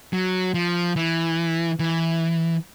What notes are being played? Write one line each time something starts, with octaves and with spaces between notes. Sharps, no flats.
F#3
F3
E3
E3